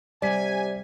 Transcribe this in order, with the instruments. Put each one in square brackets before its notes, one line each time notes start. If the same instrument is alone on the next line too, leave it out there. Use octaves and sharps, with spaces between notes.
[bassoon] C3 [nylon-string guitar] G3 [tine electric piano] D5 B6 [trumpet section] G#5